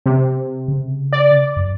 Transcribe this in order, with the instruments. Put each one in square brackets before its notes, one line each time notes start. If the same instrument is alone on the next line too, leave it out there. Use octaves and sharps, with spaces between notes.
[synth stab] C3
[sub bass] C#3
[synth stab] D5
[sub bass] F#2